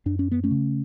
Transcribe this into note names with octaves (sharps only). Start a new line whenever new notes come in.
F#2 D4
C#4
B3
A3 C#4
C#3